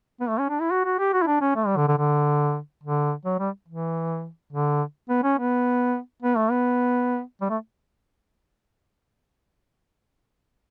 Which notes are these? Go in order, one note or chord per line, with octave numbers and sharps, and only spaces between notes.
B3
A3
C#4
D4
E4
F#4
F#4
G4
F#4
E4
D4
C#4
A3
G3
D3
D3
D3
D3
F#3
G3
E3
D3
B3
C#4
B3
B3
A3
B3
G3
A3